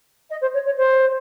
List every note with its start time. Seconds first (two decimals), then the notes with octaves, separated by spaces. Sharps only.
0.30 D#5
0.41 C5
0.53 C#5
0.65 C#5
0.77 C5